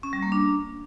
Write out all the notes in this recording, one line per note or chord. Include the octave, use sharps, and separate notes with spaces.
C#4
G3
A#3
D4